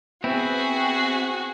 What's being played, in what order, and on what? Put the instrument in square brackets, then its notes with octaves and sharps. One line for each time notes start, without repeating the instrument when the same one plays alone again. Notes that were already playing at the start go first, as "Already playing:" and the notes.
[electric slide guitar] B3 [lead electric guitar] C4 E4 [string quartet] F#4 G#4